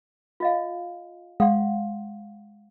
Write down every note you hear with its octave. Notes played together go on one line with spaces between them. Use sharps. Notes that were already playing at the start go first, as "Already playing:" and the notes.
F4 D#5 F5
G#3 F5 F#5 C6